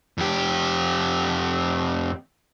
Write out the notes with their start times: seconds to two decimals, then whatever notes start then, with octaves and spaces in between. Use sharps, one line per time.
0.18 F2 G4